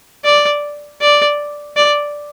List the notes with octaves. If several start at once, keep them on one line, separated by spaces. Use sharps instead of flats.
D5
D5
D5